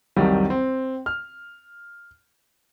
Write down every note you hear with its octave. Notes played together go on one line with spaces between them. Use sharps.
C2 F2 C3 D#3 F#3 G3
C4
F6